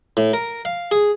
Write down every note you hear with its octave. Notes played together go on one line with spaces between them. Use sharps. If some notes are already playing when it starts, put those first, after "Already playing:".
A2
A#4
F5
G#4